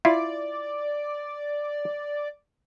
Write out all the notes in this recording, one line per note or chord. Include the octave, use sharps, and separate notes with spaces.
E4 F4 D5